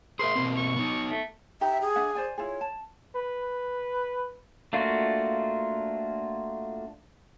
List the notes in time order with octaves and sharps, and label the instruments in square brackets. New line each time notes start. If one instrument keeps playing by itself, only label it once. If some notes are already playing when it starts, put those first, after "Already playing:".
[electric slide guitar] G#4 A#4 E5 [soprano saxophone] C6
[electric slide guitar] B2 A#3 C4
[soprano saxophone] C#6
[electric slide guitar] B3 D#4
[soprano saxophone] A3
[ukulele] D#4 G4 A#5 [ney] E5
[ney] G#4
[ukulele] D4 E5 F#5
C5 D5 G#5
[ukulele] E4 F4 G#4 [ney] C#5
[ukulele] A5
[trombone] B4
[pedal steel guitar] A3 A#3 D4 F4 F#4